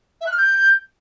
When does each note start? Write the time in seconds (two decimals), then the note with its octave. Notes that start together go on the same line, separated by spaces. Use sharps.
0.21 E5
0.26 F#6
0.32 F6
0.37 G6